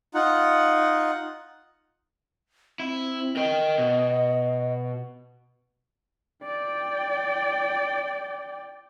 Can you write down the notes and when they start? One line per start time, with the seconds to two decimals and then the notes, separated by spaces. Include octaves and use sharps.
0.14 D#4 F4 F#5
2.80 C4 E4
3.37 A#4 D#5 G5
3.78 B2
6.44 D5 G5